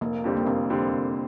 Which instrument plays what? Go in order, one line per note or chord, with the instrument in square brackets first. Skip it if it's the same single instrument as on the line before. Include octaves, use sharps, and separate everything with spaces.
[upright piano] F1 [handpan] A#3
[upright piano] F2 D3 G3 C4
[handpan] A#3
[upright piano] F1 [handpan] C4
[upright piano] F2 D3 G3 C4
F1